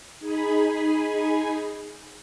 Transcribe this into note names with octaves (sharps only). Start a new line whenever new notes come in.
D#4 G#4 G#5 B5